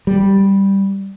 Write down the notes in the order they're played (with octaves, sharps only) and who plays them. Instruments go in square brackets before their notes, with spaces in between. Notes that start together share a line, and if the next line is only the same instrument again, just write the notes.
[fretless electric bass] G3